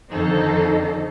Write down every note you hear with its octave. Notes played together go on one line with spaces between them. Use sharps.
F2 D3 D#3 D#4 A4 C5